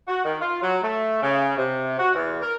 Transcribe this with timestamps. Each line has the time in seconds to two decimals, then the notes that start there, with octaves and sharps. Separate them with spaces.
0.08 F#4
0.24 D#3
0.40 F4
0.62 F#3
0.82 A3
1.22 C#3
1.57 C3
1.99 F#4
2.15 E2
2.42 A#4